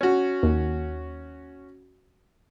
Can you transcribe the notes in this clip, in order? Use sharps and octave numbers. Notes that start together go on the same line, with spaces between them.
C#4 F#4
D#2